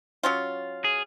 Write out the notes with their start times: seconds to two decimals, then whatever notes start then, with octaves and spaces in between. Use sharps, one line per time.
0.23 F#3 C#4 F4
0.84 G#4